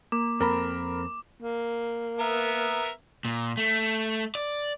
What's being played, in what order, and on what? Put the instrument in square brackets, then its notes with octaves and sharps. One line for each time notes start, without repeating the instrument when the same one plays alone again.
[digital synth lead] A#3 [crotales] D6
[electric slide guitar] F2 C4 A4 [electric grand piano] A#4 A#5 B5
[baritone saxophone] A#3
[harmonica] B3 A#4 E5
[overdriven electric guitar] A#2
A3
D5